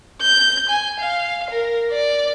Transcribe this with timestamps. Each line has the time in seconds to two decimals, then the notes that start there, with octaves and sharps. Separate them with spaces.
0.22 G6
0.70 G#5
1.00 F5
1.51 A#4
1.92 D5